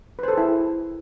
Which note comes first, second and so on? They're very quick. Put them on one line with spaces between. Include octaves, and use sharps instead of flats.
B4 C5 A4 G#4 E4